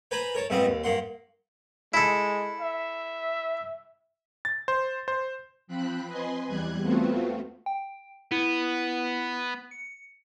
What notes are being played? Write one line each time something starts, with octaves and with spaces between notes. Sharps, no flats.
B4 C5 G#5 A#5 B5
A#4 C#5 A5
G#2 B2 G3 C4 F4 D#5
D#2
G2 A#3 F#5 C6
G#3 E4 A4
E5
A6
C5
C5
F3 C4 B5 F#6
B4 D#5 G#5 C6
E2 G3 F#6 G#6
A3 B3 C4 F4 F#4
G5
B3 E4
C#7